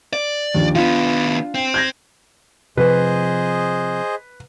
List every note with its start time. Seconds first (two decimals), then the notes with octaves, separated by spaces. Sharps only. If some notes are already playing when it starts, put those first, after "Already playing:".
0.13 D5
0.55 D#2 D3 F3
0.75 D#3 B3 D4 F4
1.55 C4
1.74 G6 G#6 A#6
2.77 C3 F3 G#4 B4 C5 D#5